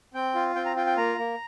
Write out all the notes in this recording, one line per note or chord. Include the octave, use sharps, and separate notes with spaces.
C4 G5
F4
C4 G5
A#5
F4 G5
G5
A#3 A#5
A#3